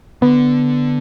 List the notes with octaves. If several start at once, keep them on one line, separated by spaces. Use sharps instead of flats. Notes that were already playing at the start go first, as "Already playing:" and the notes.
D3 B3